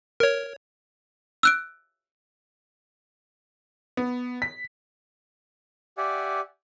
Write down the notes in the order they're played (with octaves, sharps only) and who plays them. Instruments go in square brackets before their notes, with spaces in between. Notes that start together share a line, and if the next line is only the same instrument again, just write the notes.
[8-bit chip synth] A#4 C#5
[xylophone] E6 F#6 D7
[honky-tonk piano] B3
B6
[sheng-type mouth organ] G4 D5 E5 F#5 G#5